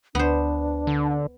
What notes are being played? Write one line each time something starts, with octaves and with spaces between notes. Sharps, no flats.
D2 B3 D4 C5
D3